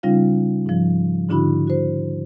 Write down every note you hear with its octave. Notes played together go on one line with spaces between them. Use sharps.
C#3 G3 C#4 D#4 F4 F5
G#2 F3
G#2 D3 D4 E4 F#4 B5
F#4 C5